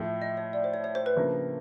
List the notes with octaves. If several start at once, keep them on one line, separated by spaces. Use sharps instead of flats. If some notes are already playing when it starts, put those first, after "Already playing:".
Already playing: A2 F3 A3
D#5
C#5
D5
C5
C#5
C#5
C5
B4
C#3 F3 A#3 D4